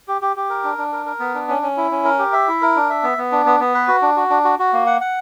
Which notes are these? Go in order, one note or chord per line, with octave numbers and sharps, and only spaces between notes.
G4
G4
G4
A#4
D4
D4
A#4
A#4
B3
D4
C#4
C#4
E4
C#4
A#4
G4
E5
E4
A#4
D4
E5
B3
B3
D4
B3
B3
B4
F#4
D4
F#4
D4
F#4
F#4
A#3
F#5
F#5